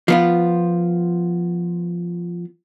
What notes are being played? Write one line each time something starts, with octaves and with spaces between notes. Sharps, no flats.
F3 B3 F4